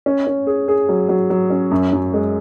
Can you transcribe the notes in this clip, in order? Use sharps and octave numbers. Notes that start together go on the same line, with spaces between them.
C#4
C#4
G#4
G#4
F#3
F#3
F#3
C#4
F#2
F#2
G#3